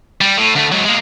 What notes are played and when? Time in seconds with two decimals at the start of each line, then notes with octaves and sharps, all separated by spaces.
0.21 G3
0.37 A2
0.55 D2 A3
0.72 G#2 F#3
0.85 G#3 A#3